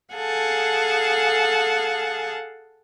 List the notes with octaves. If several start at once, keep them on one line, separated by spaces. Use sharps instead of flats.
G#4 A4 F5 F#5 G#5 A5